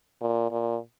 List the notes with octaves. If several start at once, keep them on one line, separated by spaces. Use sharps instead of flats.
A#2
A#2